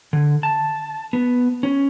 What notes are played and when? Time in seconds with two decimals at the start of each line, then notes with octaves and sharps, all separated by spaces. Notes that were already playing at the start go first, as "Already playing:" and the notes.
0.13 D3
0.43 A5
1.13 B3
1.63 C#4